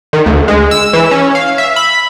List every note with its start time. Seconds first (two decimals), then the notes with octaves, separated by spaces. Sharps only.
0.13 D#3
0.26 D2
0.48 G#3
0.71 E6
0.93 E3
1.11 C#4
1.35 F5
1.58 E5
1.76 B5